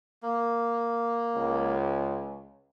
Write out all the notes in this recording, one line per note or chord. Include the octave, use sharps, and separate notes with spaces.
A#3
C#2